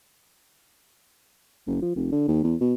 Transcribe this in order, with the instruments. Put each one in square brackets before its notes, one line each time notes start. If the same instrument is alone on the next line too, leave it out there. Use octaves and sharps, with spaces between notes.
[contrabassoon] F#1
F3
F1
D3
D#2
E2
B2